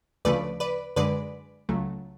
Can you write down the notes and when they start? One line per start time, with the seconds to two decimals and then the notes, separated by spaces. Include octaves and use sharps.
0.25 D2 C#3 F3 A3 B4 D5
0.60 B4 D5
0.96 F#2 D3 G#3 B4 D5
1.69 C#2 C#3 F#3 A3